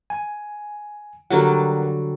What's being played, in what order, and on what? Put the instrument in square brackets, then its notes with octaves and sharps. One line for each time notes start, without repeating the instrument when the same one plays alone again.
[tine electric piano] G#5
[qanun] D3 F#3 G3 [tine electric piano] A#4 F#5